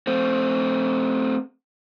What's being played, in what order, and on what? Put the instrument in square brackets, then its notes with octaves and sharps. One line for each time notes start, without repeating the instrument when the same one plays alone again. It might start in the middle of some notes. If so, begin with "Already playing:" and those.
[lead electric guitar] A3 C4